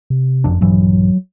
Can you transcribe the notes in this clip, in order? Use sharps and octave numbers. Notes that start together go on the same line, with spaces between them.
C3
F#1 F2 D4
A#1 G2 E3 F#3